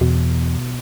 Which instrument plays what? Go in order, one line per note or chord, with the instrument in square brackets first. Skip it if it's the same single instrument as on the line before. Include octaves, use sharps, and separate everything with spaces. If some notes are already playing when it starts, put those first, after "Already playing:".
[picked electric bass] E2 [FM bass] B2